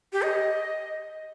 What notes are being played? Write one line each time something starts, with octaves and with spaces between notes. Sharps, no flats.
G4
D#5